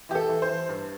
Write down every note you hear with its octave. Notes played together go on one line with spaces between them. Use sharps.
E3 G4
A4
E3
C5
E3
G2